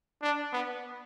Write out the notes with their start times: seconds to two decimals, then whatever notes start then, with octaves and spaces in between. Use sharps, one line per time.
0.22 D4
0.53 B3